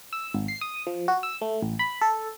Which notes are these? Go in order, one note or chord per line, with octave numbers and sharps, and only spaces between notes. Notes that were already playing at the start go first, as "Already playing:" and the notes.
E6
G#1
C7
D#6
F3
F#4
E6
A3
A1
B5
A4